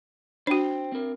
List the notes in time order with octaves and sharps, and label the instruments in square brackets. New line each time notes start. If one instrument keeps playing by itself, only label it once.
[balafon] D4 F#4 [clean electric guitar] C5 G5
[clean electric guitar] C4 A#4